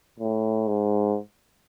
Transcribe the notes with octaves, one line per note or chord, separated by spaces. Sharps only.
A2
G#2